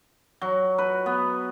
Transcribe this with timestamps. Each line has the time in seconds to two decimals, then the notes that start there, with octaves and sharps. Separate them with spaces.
0.42 F#3
0.78 B4
1.06 B3